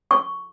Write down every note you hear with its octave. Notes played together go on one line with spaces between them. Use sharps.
C#6